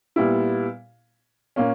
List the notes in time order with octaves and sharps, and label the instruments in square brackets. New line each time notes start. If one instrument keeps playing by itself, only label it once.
[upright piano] A#2 G3 B3 E4
A#2 A#3 C#4